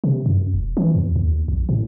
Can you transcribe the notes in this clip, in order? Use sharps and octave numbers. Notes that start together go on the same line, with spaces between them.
C3
F#2
E1
E3
E2
D#2
A#1
A2